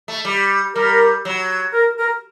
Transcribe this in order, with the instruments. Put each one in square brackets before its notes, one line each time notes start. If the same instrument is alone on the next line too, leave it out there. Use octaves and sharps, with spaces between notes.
[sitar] A3
G3
[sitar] G3 [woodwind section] A#4
[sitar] F#3
[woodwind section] A#4
A#4